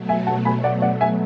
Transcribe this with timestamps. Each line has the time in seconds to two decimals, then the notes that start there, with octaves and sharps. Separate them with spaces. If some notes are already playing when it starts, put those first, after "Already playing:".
Already playing: B2 F#3 A3
0.09 E5 G#5
0.27 F#5 A5
0.45 G#5 B5
0.64 D5 F#5
0.82 D5 F#5
1.01 E5 G#5